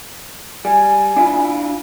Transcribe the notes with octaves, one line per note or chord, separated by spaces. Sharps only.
G3 G#5
D4 E4 F4